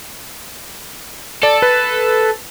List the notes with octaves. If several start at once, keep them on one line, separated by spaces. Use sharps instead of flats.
A4 D5
B4